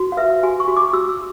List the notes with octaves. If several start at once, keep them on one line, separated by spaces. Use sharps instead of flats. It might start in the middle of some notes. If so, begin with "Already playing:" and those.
Already playing: F#4
F5
B4 E5
F#4 G#5
C#6
F#4
D6
F#4 E6